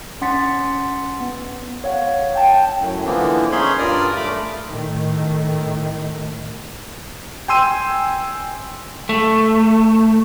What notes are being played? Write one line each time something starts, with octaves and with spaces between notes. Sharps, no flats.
C#4 F#5 C6 A6 B6 C#7
B3
C#5 F5 F#5
G5 A5
F#2 A2
D3 E3 F3 A#3 B3
C#4 D#4 G#4 C#5 B5 C6
G2 F4 A#4 D5 D#6 F6
A3 B5 D6
A2 D#3 A3
G5 G#5 C6 E6 D#7
A3